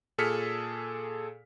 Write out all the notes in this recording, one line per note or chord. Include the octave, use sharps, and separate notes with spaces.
A#2 G#4 A4 F6 B6 C#7